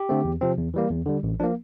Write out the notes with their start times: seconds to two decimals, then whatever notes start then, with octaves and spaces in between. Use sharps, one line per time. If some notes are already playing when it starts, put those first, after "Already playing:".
Already playing: G4
0.09 D3 A3 C4
0.25 E2
0.41 C3 F3 C4
0.58 E2
0.74 E3 G3 A#3
0.91 E2
1.06 D3 G3
1.23 A1
1.40 F3 A#3 D4